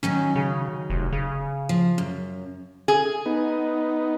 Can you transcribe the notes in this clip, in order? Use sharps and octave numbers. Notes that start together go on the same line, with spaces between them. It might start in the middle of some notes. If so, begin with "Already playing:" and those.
D#3 F#3 C#4 D#4
C#3
F1
C#3
F3
F#2
G#4
B3 D#4